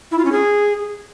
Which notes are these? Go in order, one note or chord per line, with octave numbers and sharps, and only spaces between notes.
E4
F4
C#4
G#4